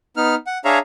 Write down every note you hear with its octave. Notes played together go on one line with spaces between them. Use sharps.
B3 D#4 F6
F#5
D4 G#4 C#5 E5 F5 A#5